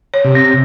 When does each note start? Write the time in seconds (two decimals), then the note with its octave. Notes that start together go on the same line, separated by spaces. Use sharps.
0.14 C#5
0.24 C3
0.35 C4